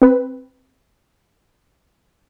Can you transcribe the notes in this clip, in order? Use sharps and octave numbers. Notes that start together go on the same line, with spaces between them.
C4 B4